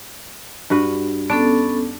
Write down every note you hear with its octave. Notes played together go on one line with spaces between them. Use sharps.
G2 F#4 B4
B3 C#4 D4 A4